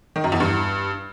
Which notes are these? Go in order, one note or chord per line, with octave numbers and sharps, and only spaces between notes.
D#3
F#2
E2
G2